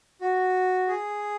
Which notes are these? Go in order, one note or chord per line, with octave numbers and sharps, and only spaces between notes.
F#4
G#4